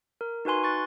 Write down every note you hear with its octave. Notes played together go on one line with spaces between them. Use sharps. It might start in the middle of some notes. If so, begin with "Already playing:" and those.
A#4
D#4 F#4 B4 G#5 C6
C#6 F#6 A6